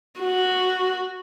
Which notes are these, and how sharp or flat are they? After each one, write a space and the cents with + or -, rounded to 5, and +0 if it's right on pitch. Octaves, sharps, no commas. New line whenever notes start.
F#4 -5